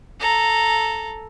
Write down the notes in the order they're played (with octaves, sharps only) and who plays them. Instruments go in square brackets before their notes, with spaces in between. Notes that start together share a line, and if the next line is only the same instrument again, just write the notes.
[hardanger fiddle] A4 A#5